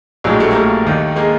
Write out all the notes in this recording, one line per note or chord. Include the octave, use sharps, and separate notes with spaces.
A#1 A2 F3 F#3 G#3
G3 A3
A#3
G3 A3
D#2 D#3
G#3 A#3